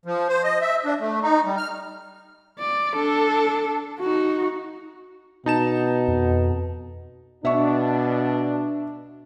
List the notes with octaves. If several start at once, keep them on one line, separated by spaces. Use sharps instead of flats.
F3
C5
D#5
E5
D4
A3
D#4
G3
F6
D5
D4 A4
D#4 F#4
B2 D#4 A5 E7
F2
B2 D4 E5 C#6